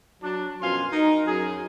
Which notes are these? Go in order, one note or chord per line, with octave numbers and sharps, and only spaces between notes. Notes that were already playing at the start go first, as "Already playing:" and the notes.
F#3 D4
F#2 B2 F3 F5 G#5 C6
D#4 A#4
F#2 G#4